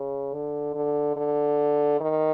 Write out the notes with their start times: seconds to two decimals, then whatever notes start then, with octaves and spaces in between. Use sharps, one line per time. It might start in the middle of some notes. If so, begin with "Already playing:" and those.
Already playing: C#3
0.33 D3
0.75 D3
1.16 D3
2.00 D#3